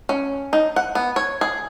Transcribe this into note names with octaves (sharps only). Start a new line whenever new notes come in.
C#4
D#4
F#5
B3
C#5
G#4